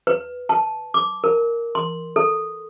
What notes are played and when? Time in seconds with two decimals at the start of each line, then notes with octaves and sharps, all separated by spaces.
0.07 B4
0.49 A5
0.94 D6
1.24 A#4
1.75 C6
2.16 A4